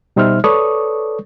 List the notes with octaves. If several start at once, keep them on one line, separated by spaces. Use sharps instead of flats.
B2 G3 D#4 C5 E5 F6
A4 B4 C#5 D5 C#6 D#6